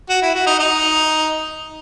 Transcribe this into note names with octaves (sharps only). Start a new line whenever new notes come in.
F#4
E4
F#4
D#4
D#4